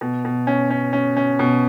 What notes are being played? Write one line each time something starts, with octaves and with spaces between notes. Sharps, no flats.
B2
B2
C#4
C#4
C#4
C#4
B2